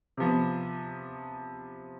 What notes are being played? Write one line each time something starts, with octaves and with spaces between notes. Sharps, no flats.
C3 F3 B3